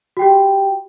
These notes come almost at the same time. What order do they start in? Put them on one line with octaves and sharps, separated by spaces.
F#4 G5 G4